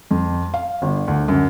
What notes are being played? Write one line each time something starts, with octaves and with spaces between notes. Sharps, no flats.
F2
F5
G1
D2
F#2